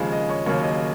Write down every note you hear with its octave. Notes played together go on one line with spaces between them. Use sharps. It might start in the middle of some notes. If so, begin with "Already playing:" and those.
Already playing: D#2 C#3 F3 G#3
D#5
C#5
D#2 C#3 F#3 A#3 C#5
D#5